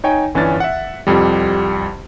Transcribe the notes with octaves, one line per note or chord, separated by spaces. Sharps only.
D#4 C#5 G5 G#5
G1 E3 C#4 D4 A6
E5 F#5
C2 F2 G3